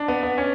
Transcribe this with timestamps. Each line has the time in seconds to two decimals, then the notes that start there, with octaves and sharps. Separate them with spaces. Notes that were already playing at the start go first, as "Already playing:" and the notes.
Already playing: D4
0.08 B3
0.23 B3
0.38 C#4